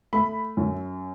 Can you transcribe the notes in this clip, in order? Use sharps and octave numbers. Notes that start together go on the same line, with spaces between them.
A3 B5
F#2